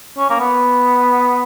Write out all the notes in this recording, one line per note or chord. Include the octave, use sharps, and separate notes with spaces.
C#4
A#3
B3